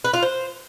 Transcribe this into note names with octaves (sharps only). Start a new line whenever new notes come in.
B4
F4
C5